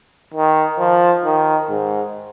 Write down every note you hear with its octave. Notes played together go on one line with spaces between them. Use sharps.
D#3
F3
D#3
G#2